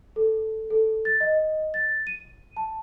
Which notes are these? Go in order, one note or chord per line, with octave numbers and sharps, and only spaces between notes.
A4
A4
A6
D#5
A6
D#7
A5